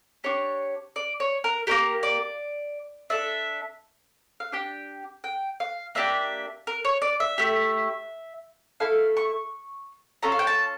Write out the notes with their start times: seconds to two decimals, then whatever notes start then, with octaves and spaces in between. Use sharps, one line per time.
0.24 D4 G4 C#5
0.96 D5
1.20 C#5
1.44 A#4
1.67 A#3 C#4 G4 A#4
2.03 D5
3.10 D4 A4 E5
4.40 F5
4.52 D4 G4 G5
5.24 G5
5.60 F5
5.95 A#3 D4 G4 E5
6.67 A#4
6.85 C#5
7.02 D5
7.20 E5
7.38 A3 E4 G4
8.80 A3 E4 A4 F5
9.17 C#6
10.23 C#4 F4 A4 A#5
10.32 F5
10.39 G5
10.47 A5